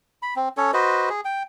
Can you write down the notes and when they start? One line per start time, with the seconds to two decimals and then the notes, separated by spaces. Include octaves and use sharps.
0.22 B5
0.36 C4
0.57 C#4 A4 C#5
0.73 F#4 B4 C5 D#5
1.09 G#4
1.25 G5